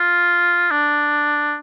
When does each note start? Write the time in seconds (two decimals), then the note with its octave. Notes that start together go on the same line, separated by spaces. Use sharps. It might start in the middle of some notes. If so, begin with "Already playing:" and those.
Already playing: F4
0.71 D4